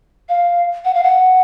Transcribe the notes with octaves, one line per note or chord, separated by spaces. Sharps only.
F5
F#5
F5
F#5